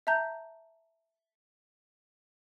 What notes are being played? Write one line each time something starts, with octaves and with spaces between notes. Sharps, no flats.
E5 A5 A#5 G6